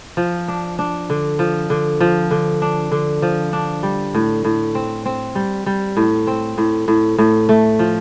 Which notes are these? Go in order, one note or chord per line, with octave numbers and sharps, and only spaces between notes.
F3
D4
D4
D3
F3
D3
F3
D3
D4
D3
F3
D4
G3
A2
A2
C4
C4
G3
G3
A2
C4
A2
A2
A2
A3
F3